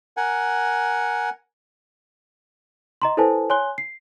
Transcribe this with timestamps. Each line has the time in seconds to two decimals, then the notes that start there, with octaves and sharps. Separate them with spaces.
0.17 A#4 F#5 G#5
3.02 D#5 A#5 C6
3.17 E4 A4 B4 C5 G#5 A5
3.50 C#5 G#5 C6 F#6 G7
3.78 C7